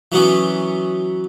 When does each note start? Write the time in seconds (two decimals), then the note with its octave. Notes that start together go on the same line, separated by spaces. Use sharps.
0.12 E3 F#3 B3 C#4